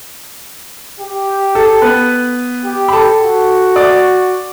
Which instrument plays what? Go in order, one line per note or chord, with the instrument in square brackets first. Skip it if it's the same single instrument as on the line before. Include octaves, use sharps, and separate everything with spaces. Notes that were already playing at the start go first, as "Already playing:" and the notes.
[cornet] G4
[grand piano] A4
B3 B4
[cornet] G4
[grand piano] B5
A4 A5
[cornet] F#4
[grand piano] D5 D6